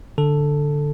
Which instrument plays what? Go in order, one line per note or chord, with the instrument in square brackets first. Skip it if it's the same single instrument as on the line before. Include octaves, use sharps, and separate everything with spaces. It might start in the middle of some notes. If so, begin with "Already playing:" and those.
[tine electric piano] D3 A4